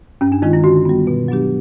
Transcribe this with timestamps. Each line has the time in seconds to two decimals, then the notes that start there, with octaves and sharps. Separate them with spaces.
0.21 G2 C#4
0.32 D4
0.42 D#3 G#3 C#4 D#4 F4
0.53 E4
0.64 D3 F#4
0.85 G3 B3
1.07 B2
1.28 F#3 B3 D4 G4